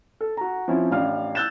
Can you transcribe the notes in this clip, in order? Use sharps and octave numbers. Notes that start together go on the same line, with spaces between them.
A4
F#4 A#5
F3 C4 C#4 E4
A1 D4 F5 F6
E6 F#6 G6 A6 E7